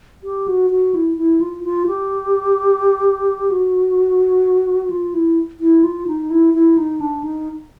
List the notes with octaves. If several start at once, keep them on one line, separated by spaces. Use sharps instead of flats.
G4
F#4
F#4
E4
E4
F4
F4
G4
F#4
F4
E4
E4
F4
D#4
E4
E4
D#4
D4
D#4